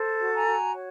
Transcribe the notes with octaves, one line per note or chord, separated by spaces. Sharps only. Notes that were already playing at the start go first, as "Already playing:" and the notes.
Already playing: A4 C5
F#4
G#5 A#5
F#4
C#5